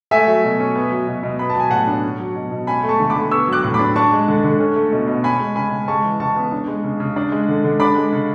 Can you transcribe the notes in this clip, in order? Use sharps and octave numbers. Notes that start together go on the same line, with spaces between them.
A3 E5 G#5
F#3
B2
C#4
B3
F#3
B2
B2
B3 B5
A5
F#3 G#5
A2 F#5 A5
D4
C#4
F#3
B2
B2
C#4 G#5 B5
A3
A5 C#6
D3
B5 D6
D3
B3 C#6 E6
F#3
D6 F#6
A2
B5 D6
D4
D4 A5 C#6
G#3
D3
D3
C#4
A3
B2
B2
C#4 G#5 B5
G#3
C#3 G#5 B5
C#3
G#3 A5 C#6
E3
C#3 A5 C#6
B3
D4
G#3
C#3
C#3
D4
G#3
D3
D3
D4 B5 D6
G#3
C#3